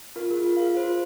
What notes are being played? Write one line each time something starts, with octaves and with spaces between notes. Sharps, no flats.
F4 A#4
G#4
F4
A#4
F5
G#4
F4 C5